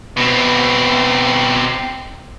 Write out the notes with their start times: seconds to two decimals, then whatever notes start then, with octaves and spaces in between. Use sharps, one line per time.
0.17 B2 C4